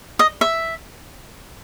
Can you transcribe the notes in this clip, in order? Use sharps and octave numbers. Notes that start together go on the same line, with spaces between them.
D#5
E5